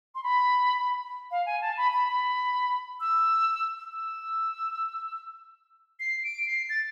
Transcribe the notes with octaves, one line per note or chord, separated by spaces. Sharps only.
C6
B5
F5
G#5
A5
B5
B5
B5
E6
E6
C7
D7
C7
A6